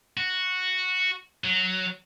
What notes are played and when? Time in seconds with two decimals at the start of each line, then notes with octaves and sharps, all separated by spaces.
0.17 F#4
1.44 F#3